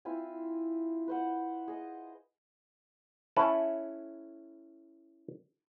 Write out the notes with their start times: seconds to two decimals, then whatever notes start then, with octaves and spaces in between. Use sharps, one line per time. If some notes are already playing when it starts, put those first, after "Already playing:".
0.05 C4 E4 F4 G#5
1.08 B4 C5 F#5
1.68 G#4 D#5
3.37 C#4 E4 A4 B4